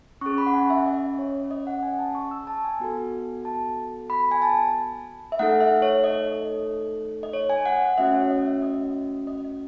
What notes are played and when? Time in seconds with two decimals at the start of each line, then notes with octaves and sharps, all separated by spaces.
0.21 C#4 G#4 C#6
0.38 B5
0.47 F#5
0.54 G#5
0.70 E5
0.86 D#5
1.19 C#5
1.51 D#5
1.67 F#5
1.83 G#5
1.99 A5
2.15 C#6
2.31 E6
2.47 A5
2.65 G#5
2.80 B3 F#4 A4
3.45 A5
4.10 B5
4.31 G#5
4.42 A5
5.32 E5
5.39 A3 D#4 A4 F#5
5.60 E5
5.82 C#5
6.04 D#5
7.23 D#5
7.33 C#5
7.50 G#5
7.65 F#5
7.82 F#5
7.98 A3 C#4 F#4 E5
8.14 C#5
8.30 D#5
8.47 E5
8.62 D#5
9.27 D#5
9.45 D#5